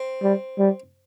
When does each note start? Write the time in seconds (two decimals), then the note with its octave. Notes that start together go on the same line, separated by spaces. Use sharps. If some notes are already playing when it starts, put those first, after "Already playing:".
Already playing: C4
0.23 G3
0.59 G3